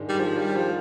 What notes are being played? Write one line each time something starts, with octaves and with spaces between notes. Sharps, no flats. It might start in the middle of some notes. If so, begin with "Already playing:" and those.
Already playing: G#2 D#3 G#3 D4
G3
F3
G3
F3